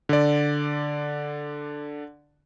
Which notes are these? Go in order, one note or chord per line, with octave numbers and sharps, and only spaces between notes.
D3 D5